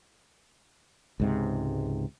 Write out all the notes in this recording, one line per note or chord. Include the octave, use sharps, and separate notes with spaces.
C#2 G#2 C3